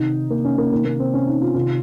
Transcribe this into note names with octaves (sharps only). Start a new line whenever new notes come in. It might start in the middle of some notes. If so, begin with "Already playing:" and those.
Already playing: C3 D#3 D#4
A#3
C#4
A#3
C3 D#3 A#3
A#3
C4
C#4
D#4
F4
C3 D#3 F4